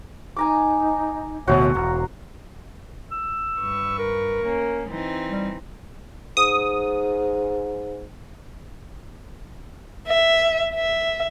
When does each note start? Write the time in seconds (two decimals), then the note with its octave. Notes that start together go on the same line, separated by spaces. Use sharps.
0.37 D#4 G#5 A#5 D6
1.48 D1 D2 B2 F#4 C5 C#5 E5
1.75 E1 A#5
3.11 E6
3.58 G2 B4 C#6
3.98 A#4
4.43 A#3 C#4
4.89 E3 C4 D#4
5.29 G3
6.37 G#2 D#6
10.07 E5
10.75 E5